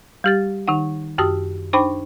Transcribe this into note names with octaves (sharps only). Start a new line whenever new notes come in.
G3 G4 A6
D#3 D#4 F#5
F#2 F#4 G4 A5 D#6
D4 D#4 C5 G5 B5 D6